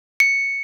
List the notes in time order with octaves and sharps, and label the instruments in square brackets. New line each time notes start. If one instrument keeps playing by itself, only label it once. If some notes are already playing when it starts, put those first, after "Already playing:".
[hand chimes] C#7